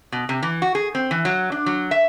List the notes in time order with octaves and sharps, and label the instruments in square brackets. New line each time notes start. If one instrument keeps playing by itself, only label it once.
[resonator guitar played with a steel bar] B2
C3
E3
F#4
G#4
C4
E3
F#3
D4
F#3
E5